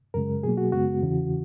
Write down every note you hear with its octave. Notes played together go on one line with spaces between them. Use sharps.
F#2 C#3 G#3 A#4
B2 F#3 A#3 G#4
F#4
F#2 C#3 G#3 B3 F#4
E2 C#3 E3